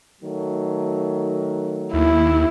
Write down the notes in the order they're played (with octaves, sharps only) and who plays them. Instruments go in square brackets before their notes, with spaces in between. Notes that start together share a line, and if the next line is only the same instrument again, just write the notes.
[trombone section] D#3 F#3 A3
[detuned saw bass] D#2 [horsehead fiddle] E4